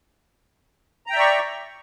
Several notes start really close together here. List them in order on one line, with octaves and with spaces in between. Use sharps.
A#5 G5 E5 D5 C#6